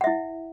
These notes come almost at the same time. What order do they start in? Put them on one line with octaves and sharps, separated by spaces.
F#5 E5 E4